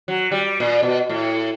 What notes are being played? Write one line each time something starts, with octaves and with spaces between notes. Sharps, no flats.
F#3
G3
A#2
B2
A2